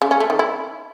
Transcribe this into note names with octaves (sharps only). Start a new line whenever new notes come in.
C#3
C#4
A3
D#3
E4